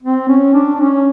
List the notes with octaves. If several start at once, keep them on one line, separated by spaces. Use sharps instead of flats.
C4
C#4
D4
D4
C#4